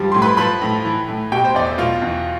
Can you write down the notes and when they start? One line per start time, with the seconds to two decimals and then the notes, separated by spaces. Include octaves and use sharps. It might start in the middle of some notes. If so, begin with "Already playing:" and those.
Already playing: G2 F3 G3 G4
0.12 A2 C6
0.22 B4 B5
0.37 F3 B4 B5
0.62 A2
0.85 E3
1.08 A2
1.32 B2 G4 G5
1.45 C5
1.54 E2 D5
1.67 E5
1.78 B2 F4 F5
2.02 E2